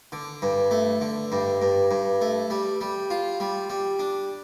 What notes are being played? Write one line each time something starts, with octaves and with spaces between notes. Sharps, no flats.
D3
G2
A3
D3
G2
G2
G2
A3
G3
G3
F4
G3
G3
D4